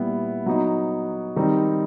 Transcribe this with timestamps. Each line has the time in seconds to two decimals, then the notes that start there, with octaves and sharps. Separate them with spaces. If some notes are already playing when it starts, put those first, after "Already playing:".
Already playing: A#2 G3 B3 E4
0.46 F#3 B3 D#4
1.36 D#3 G3 C4 D#4